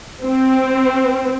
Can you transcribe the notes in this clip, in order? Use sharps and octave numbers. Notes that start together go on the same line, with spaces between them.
C4